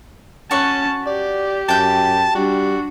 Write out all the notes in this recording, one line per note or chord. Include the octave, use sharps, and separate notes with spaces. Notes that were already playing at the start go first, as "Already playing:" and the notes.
C#4 F#4 C#5 A5 C#6
G4 D5
F#2 G5 A5 G6
G3 D4 F#4